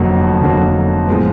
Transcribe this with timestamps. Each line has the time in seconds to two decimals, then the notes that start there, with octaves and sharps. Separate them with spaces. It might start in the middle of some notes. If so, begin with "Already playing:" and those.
Already playing: F1 F2 D3 F#3 A#3
0.41 F1 F2 D3 F#3 A#3
1.07 A2 F3 G#3 B3